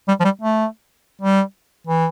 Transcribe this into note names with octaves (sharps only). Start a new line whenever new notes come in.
G3
F3
G3
A3
G3
E3